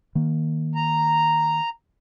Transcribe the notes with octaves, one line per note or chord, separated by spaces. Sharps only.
D#3 A#3
A#5